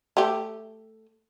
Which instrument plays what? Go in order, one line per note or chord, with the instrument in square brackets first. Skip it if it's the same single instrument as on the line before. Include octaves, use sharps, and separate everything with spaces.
[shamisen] A3 G4